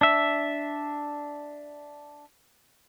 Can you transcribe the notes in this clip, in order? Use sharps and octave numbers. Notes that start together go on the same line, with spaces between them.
D4 E5